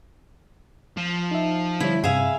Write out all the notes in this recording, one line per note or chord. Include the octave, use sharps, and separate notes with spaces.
F3
D#4 E5
D3 G3 E4 C#5
G2 C3 G#4 E5 F5